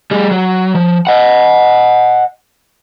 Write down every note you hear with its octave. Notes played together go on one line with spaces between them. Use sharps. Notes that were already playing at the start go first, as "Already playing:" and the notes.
G3 G#4
F#3
F3
D#5 F#5